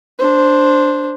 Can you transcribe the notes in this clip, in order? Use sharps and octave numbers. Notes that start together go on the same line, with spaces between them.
D4 C5